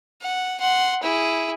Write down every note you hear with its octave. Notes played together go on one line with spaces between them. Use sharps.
F#5
F#5 C6
E4 G#4